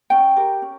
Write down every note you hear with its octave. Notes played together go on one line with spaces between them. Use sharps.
C#4 G5
G4 A#4
C#4